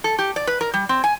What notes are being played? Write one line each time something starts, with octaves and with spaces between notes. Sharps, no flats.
A4
G4
D5
B4
A#4
G3
C4
G#5